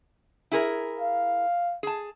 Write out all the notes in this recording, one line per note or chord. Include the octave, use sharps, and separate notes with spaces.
E4 G#4 A#4
F5
G#4 A5